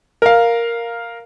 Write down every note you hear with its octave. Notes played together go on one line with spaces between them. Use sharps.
A#4 F5